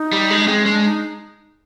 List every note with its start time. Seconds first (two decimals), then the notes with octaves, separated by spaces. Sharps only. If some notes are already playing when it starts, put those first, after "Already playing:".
Already playing: D#4
0.13 G3
0.30 G#3
0.47 G#3 C4
0.60 C#4
0.66 G#3
0.72 D4
0.85 D#4